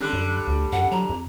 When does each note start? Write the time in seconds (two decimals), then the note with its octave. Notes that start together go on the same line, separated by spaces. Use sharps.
0.01 D3 G3 C#4 F#6
0.13 F#2
0.47 D2
0.72 F#2 F#5
0.91 F#3 A#5
1.09 F2